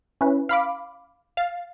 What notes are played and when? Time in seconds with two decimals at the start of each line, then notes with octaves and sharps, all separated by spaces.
0.21 C#4 E4 B4
0.49 F5 B5 D6
1.37 F5 A6 C7